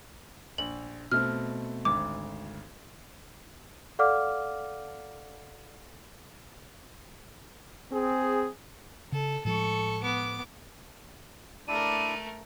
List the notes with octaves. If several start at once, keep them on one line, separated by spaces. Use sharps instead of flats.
A#1 F#7
B2 A3 C4 F6
G#1 D2 D6
A4 D5 F5 F#5 D6 F6
C4 G#4
C#3 A4
A2 F3 G#3 A4 C#6
B3 D6
A3 D4 E4 A#4 D5 D#7